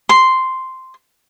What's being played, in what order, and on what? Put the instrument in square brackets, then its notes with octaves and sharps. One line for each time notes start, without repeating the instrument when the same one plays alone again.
[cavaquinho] C6